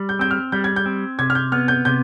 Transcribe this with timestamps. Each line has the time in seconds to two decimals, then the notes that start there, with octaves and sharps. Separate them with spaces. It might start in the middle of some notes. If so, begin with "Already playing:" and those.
Already playing: G3
0.09 G6
0.19 C4 G6
0.31 F6
0.52 G3 G6
0.64 G#6
0.76 G6
0.86 C4
1.19 C3 G#6
1.30 F6
1.35 G6
1.52 B3 F6
1.68 G6
1.85 C3 G6